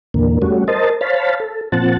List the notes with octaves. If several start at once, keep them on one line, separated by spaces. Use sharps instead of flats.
E2 A#2 D3 A#3
G3 A3 C#4 F#4
A#4 C5 D#5 A5
C5 C#5 F5 A5 B5
A4
A#2 F3 C4 F#5 A5